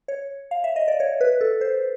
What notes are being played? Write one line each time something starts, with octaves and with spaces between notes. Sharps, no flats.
C#5
F5
E5
D#5
D5
C#5
B4
A4
C5